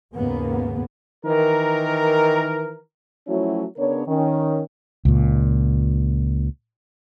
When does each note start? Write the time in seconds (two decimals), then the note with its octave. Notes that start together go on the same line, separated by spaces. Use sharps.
0.15 D#2 G#2 C#3 A#3 B3
1.25 D#3 E3 A#4
3.28 F3 F#3 A3 C#4 E4 F#4
3.77 C#3 B3 D4 A#4 C#5
4.08 D#3 C#4
5.05 C#2 A#2